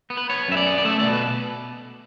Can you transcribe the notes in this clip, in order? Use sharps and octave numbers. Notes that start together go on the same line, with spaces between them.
B3
B4
B3 C#5
F#2 E5
D5
B3
D5
A3 E5
B2 D5
B4